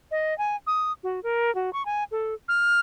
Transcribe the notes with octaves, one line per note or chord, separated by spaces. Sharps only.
D#5
G#5
D#6
F#4
A#4
F#4
C#6
G#5
A4
F6